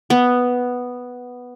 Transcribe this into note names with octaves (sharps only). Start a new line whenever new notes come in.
B3